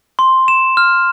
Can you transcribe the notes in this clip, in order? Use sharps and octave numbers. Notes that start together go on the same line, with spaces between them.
C6
E7
F6